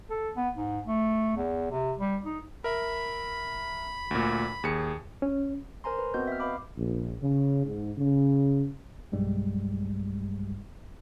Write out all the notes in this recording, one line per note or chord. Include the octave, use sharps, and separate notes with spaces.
A4
B3
G#2
A3
E2
C3
G3
D#4
A#4 E5 B5
D2 A#2
D#2 G#4 C#7
C#4
A#4 C5 G#5 A#5 C6
B4
B3 C4 F#4 D#5 G6
E5 F6
B4 D#5 F5 B5 D6
A#1
C#3
G#2
C#3
B1 G2 G3 G#3